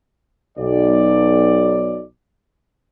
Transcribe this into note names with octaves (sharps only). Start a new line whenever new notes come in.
B1 D5